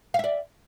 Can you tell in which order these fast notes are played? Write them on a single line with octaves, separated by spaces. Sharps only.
F5 E5 D5